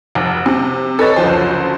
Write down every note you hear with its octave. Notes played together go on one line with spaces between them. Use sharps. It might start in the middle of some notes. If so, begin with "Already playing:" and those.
F1
C3
A4 B4 C#5 D#5 A6
F#1 D2 F3 C5